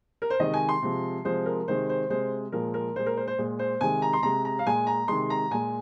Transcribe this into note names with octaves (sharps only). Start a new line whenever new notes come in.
A#4
C5
C3 D#3 G#3 D#5
G#5
C6
C3 F3 G#3
C3 F3 G#3 C5
A#4
C3 D#3 G#3 C5
C5
C3 G#3 C5
A#2 F3 G#3 A#4
A#4
A#2 G#3 C5
A#4
C5
C5
A#2 G#3
C5
C3 D#3 G#3 G#5
A#5
C6
C3 G#3 A#5
A#5
F5
A#2 G#3 G#5
A#5
C3 D#3 G#3 C6
A#5
A#2 G#3 G#5